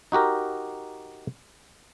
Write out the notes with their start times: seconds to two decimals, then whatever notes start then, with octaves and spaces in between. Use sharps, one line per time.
0.12 D#4 F#4 G4 A#4